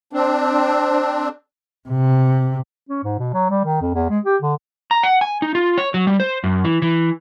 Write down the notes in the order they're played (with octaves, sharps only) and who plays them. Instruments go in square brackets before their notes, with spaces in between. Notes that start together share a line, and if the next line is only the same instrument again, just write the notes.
[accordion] C4 D4
[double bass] C3
[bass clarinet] C#4
G#2
B2
F#3
G3
D#3
F2
E2
G#3
G4
D3
[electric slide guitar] A#5
F#5
G#5
D#4
F4
C#5
F#3
G3
C5
F#2
E3
E3